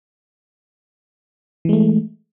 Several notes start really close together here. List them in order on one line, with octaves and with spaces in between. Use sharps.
E3 G#3 A3